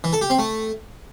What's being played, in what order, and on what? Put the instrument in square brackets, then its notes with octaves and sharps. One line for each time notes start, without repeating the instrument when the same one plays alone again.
[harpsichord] E3
A4
G4
C4
A3